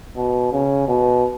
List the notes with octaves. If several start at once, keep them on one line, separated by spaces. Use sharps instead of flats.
B2
C#3
B2